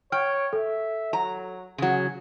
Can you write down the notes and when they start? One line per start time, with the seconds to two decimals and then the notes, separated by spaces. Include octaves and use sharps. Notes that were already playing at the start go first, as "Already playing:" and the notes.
0.12 C#5 G5 F6
0.53 A4 E5
1.13 F#3 A#5
1.78 C#3 F#3 G#4